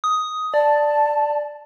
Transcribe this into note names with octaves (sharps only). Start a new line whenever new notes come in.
D#6
D5 A5